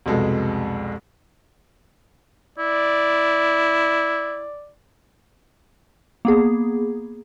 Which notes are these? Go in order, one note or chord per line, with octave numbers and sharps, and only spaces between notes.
C2 F2 B2 G#3 A4
E4 D5
A#3 B3 G#4